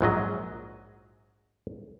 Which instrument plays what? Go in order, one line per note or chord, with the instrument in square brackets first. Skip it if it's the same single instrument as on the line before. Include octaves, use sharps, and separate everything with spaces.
[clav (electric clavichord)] A#1 G#2 F#3 D#5